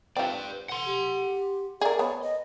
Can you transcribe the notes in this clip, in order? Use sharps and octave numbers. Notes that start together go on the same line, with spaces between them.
C4 F4 B4 D5
F#5 C6
G4
G#4 A#4 D5
B3 C#5
D#5